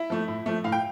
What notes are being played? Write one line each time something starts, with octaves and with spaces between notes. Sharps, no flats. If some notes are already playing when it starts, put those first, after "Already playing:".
Already playing: E4 E5
F3 A3
A2
F3 A3
A2 F5
G5